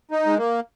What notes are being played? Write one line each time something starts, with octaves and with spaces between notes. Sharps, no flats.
D#4
G#3
A#3